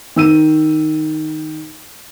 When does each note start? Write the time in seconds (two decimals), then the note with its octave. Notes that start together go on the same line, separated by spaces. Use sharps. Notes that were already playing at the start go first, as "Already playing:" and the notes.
0.16 D#3 E6 D#7